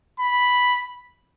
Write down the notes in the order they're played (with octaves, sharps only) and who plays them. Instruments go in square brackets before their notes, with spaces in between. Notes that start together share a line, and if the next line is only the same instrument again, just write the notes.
[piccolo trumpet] B5